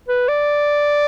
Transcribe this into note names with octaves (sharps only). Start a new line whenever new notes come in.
B4
D5